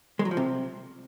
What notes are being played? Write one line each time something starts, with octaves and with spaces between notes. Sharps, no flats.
G#3
F#3
F3
C3